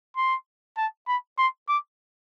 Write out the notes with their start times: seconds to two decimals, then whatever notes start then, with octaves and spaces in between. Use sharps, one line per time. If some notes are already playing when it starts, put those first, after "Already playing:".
0.17 C6
0.77 A5
1.07 B5
1.38 C6
1.69 D6